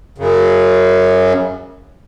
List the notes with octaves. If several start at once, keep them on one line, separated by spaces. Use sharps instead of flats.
F#2 C#3